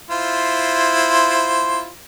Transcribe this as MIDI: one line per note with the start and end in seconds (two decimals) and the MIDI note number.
0.11 1.88 64
0.11 1.88 65
0.11 1.88 72